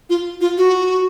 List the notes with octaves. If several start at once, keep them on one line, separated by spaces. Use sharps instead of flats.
F4
F4
F#4